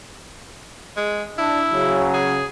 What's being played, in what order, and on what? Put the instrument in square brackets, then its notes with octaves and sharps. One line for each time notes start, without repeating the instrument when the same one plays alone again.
[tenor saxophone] G#3
[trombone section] D4 [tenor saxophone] E4
[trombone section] C#3 F#3
[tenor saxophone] G#4